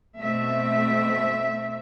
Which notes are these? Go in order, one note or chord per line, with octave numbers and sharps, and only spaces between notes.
B2 A3 C4 E5